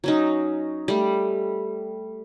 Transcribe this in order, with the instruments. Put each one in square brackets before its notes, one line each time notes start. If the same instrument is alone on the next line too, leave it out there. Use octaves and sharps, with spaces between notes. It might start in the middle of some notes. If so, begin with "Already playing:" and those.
[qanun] F#3 C#4 D#4
G3 A3